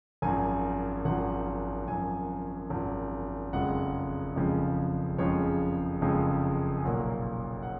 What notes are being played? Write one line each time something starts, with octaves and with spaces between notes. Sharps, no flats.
G#1 F#2 F3 G#5
G#1 F#2 F3 F#5
G#1 F#2 F3 G#5
G#1 F#2 F3
F#1 F2 C#3 F3 G#3 F#5
F#1 F2 C#3 F3 G#3
F#1 F2 C#3 F3 G#3 C#5
F#1 F2 C#3 F3 G#3
G#5
B1 A#2 F#3 A#3 F#5
F#5